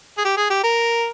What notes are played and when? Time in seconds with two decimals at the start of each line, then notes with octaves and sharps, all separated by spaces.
0.18 G#4
0.25 G4
0.37 G#4
0.50 G4
0.64 A#4